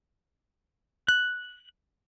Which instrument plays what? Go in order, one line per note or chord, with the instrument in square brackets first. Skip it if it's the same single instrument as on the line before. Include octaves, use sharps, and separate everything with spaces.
[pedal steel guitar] F#6